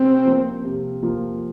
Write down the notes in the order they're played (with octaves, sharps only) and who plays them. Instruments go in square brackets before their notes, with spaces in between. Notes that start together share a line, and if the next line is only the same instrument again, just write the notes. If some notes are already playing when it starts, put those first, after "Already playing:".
Already playing: [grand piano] C3 [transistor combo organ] C4
[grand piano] F3 A#3 F4
C3
F3 A#3 F4